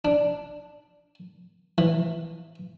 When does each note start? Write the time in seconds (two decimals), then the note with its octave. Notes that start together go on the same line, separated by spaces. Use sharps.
0.05 D4
1.78 E3